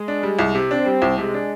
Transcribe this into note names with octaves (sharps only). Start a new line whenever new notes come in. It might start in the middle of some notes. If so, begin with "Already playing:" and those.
Already playing: G#3
D4
G3
C2
C3
C4 D4
G3
C2
C3 G#3
D4